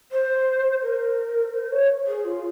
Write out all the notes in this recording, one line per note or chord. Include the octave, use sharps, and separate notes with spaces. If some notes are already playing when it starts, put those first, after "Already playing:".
C5
A#4
C5
C#5
G#4
F4